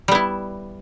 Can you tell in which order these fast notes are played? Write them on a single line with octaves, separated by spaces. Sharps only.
G3 B3 E4